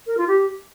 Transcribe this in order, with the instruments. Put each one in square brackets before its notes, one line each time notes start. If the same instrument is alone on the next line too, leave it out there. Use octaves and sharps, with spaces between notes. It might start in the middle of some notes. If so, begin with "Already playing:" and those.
[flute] A#4
F4
G4